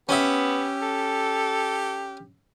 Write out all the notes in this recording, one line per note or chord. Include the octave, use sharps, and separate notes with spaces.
B3 C#4 G4 E5
A4